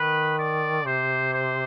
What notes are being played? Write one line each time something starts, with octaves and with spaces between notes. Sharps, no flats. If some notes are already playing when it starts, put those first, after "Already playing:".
Already playing: D#3 B4
D5
C3 C5
C5